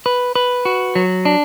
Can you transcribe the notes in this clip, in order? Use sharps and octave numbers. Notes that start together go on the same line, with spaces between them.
B4
B4
F#4
F#3
D4